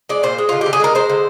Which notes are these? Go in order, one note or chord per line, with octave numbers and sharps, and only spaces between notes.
G#3 D5
A#2 C5
G#3
D3 F4
D3 G4
G#4
G#3 A#4
G#3 C5
D3